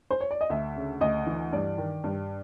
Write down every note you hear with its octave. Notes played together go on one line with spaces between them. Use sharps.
C5
C#5
D5
D#5
D2 E5
C#3
D2 D#5
E3
G2 D5
D#3
G2